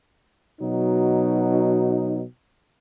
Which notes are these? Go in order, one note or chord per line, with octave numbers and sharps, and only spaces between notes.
B2 F#3 D#4